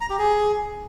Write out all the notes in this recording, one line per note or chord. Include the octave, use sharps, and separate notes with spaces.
A#5
G4
G#4